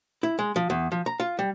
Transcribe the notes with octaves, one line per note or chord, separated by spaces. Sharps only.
E4
G#3
F3
E2
F3
A#5
F4
G3